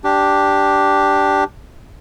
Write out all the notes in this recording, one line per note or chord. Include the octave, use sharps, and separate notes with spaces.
D4 G4